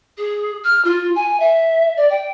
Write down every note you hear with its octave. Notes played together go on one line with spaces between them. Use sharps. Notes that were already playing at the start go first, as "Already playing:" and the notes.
G#4
F6
F4
G#5
E5
D5
G5